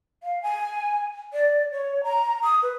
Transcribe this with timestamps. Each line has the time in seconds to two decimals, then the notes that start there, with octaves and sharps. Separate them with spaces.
0.23 F5
0.43 G#5
1.33 D5
1.72 C#5
2.04 A#5
2.44 D#6
2.63 B4